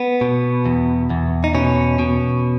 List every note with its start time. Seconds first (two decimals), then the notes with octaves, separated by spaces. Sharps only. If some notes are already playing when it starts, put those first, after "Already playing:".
Already playing: B3
0.21 B2
0.66 E2
1.10 E2
1.44 D#4
1.55 B2 C#4
1.99 B2